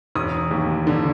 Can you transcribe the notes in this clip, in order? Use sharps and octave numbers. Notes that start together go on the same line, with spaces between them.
E1 D#6
D#2
D3